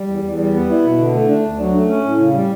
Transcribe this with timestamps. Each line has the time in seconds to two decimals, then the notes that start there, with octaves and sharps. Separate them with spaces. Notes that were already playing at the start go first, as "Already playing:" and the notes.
Already playing: G3
0.08 E2
0.23 E2
0.38 G3
0.53 B3
0.69 E4
0.83 B2
0.98 D3
1.14 A3
1.28 D4
1.44 D2
1.59 F#3
1.74 A3
1.89 C#4
2.05 A2
2.19 C#3
2.34 G3